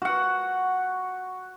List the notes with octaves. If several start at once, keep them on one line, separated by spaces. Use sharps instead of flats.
F#4 F#5